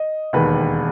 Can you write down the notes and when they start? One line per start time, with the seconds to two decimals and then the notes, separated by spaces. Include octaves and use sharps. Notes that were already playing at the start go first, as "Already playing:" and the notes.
Already playing: D#5
0.33 E1 D#2 D#3 B4